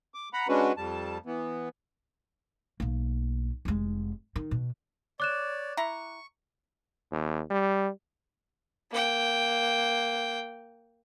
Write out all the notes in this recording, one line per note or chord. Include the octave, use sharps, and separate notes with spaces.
D6
F#5 A#5 B5
G#3 C#4 D4 F#4 B4
F2 G3 A5
E3 B3
B1 A#3
F1 G#3
D#3
B2
C#5 D5 D6 F#6 E7
E4 A#5 C#6
D#2
G3
A#3 G5